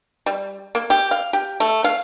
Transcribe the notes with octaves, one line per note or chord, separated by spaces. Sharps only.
G3
A#3
G4
F5
G4
A3
F5